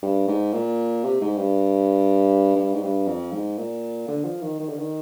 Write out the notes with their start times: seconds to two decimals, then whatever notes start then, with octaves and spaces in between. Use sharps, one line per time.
0.02 G2
0.28 G#2
0.53 A#2
1.04 C3
1.21 G#2
1.37 G2
2.55 G2
2.74 G#2
2.82 G2
3.07 F2
3.32 G#2
3.58 A#2
4.08 D3
4.25 F3
4.43 D#3
4.59 D#3
4.69 D3
4.79 D#3